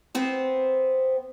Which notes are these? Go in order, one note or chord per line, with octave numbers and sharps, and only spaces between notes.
B3 C4 C5